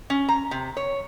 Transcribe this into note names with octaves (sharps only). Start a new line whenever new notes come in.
C#4
A#5
C3
C#5